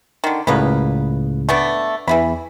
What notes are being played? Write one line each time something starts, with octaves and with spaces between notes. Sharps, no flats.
D3 D#3
C#2 A2 C#3 A#3 B3 B4
A3 B3 D4
E2 E3 E4 B5